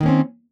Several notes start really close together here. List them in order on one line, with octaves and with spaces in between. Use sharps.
D#3 A#3 C#4 C4